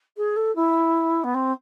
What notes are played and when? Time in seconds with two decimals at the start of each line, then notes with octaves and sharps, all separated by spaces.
0.17 G#4
0.36 A4
0.55 E4
1.24 B3
1.34 C4